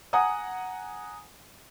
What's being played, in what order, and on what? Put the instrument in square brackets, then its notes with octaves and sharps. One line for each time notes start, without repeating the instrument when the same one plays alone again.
[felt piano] F#5 G#5 A#5 D#6